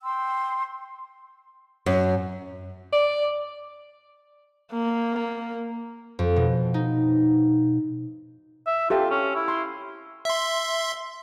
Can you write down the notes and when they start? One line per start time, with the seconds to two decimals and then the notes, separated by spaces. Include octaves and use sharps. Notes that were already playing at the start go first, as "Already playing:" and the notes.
0.02 G5 C6 E6
1.86 F#2
2.93 D5
4.72 A#3
6.19 F2
6.36 B2
6.74 D#4
8.67 E5
8.90 F4 G4 A4 E5
9.10 C#4
9.35 E4
9.48 C6
10.25 E5 C6